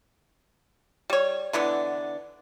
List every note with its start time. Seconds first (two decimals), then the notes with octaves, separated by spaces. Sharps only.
1.10 G3 C#5
1.53 D3 E3 B3 D4